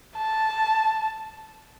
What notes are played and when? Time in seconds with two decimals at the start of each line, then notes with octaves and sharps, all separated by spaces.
0.17 A5